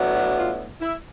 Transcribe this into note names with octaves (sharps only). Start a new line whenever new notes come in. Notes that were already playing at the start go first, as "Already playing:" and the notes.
Already playing: A2 F#3 B3 D4
F#4
F4
E4